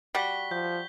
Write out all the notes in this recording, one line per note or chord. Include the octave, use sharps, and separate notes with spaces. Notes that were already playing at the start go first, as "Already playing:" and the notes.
G3 F#4 B6 G7
F3 G6